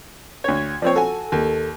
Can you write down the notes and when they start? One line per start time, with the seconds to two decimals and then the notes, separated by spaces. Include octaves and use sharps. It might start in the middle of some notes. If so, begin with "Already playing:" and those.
0.44 D2 C#5 G#6
0.82 F3 C4 C#5 D5 G5
0.96 F#4 A4 G#5
1.32 D#2